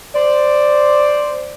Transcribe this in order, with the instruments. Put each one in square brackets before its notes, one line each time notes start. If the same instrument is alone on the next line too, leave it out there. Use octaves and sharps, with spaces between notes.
[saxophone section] C5 D5